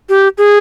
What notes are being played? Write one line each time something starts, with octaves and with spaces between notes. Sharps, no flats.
G4
G#4